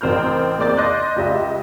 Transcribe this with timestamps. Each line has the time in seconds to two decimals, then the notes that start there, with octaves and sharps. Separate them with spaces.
0.01 A1 C4 A#4 F6 G6
0.58 A#3 G#4 D5 D6 G6 A6
0.77 D#5 C6 D6 F#6 G6
1.16 C#2 G4 D#5 E5